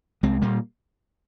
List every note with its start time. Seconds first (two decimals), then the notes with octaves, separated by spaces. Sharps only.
0.23 C2 G#3 C4
0.42 A#2 G3 A#3